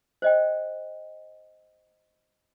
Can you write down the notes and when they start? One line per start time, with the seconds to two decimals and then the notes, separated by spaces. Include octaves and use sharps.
0.22 C5 D#5 G5